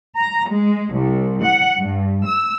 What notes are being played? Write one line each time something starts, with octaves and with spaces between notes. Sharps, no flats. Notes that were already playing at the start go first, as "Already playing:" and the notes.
A#5
G#3
C2
F#5
G2
E6